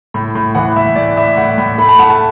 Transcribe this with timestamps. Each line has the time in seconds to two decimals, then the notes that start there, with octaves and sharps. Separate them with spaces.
0.14 A2
0.35 A2
0.55 E3 F#5
0.76 A2 E5
0.96 A2 D5
1.16 A2 E5
1.37 A2 F#5
1.58 A2
1.78 A3 B5
1.89 A5
1.99 A3 F#5
2.10 A5